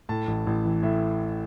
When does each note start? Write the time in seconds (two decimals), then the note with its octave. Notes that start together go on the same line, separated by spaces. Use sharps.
0.09 A2 A5
0.27 A1
0.47 A1
0.65 E3
0.83 A2 E5